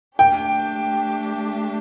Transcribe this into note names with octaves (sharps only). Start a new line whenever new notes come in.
A3 D4 G4 G5